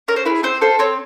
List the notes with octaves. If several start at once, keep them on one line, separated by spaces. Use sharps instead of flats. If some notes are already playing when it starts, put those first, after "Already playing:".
C#4 A#4
C5
E4 G#4 B4
C4 C5
F4 A4 C5
C4 C#5